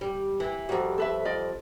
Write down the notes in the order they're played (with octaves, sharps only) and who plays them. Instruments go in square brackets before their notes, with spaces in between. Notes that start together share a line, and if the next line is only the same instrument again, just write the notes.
[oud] G3
E3
[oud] F2 G3 [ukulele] F#4 A#4
[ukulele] A4 B4 E5
F4 D5 D#5